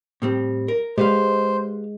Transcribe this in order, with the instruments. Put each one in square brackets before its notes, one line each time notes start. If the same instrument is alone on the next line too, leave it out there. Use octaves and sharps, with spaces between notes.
[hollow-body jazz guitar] A2 G3 C4
A#4
[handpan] G#3 [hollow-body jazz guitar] G4 B4 F5 [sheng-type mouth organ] C5